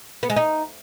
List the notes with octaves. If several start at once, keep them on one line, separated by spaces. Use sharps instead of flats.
B3
G#3
D#4